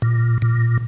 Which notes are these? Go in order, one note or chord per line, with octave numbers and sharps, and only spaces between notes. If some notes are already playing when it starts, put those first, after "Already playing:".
A#2
A#2